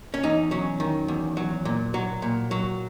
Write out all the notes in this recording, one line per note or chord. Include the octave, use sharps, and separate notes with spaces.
C#4
E2 D#4
F#3 C#4
D#3
E2
F#3
A#2
F#3
A#2
F#3